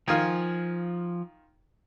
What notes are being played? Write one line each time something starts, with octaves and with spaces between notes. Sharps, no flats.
D#3 F3 F4 G#5